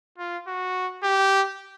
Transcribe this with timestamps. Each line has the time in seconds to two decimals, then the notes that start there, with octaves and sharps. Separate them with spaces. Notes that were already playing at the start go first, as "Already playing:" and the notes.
0.18 F4
0.47 F#4
1.04 G4